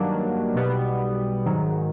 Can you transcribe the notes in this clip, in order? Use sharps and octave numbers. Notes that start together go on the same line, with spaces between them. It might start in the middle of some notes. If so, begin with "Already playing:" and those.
Already playing: G2 D#3 F#3 A#3 D4
B1 B2 G3 B3
G#2 D#3 F#3